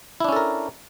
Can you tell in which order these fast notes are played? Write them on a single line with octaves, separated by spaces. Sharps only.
E4 D4 C#4 A4 A#4